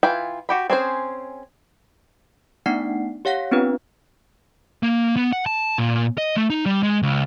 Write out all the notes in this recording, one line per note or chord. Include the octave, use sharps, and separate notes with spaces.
E3 F4 G5 G#5 B5
F#4 G4 B5
C4 C#4 G#4 C5
A3 B3 D4 D#4 F#5 C7
G4 C#5 F5 F#5 A#6
B3 C4 D4 F4 B4
A#3
B3
F#5
A5
A#2
D#5
A3
D#4
G3
G#3
C#2